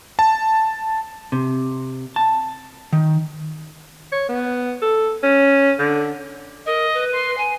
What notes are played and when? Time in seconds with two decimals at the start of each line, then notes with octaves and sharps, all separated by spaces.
0.19 A5
1.32 C3
2.16 A5
2.93 D#3
4.12 C#5
4.29 B3
4.82 A4
5.23 C#4
5.79 D3
6.66 A#4 D#5
6.93 B4
7.13 C6
7.37 G#5